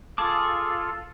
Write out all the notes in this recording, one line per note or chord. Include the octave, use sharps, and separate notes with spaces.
F4 G#4 A4 A5 D6